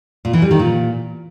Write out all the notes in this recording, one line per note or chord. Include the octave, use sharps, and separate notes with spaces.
A#2
E3
G3
D#3
A#2